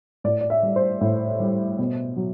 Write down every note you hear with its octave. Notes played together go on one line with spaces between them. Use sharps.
A2 D5
D5
E5
G3
C5
A2
G3
B2
F#3